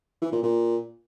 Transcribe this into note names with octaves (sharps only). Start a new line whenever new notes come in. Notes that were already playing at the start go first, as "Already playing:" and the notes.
E3
A#2
A#2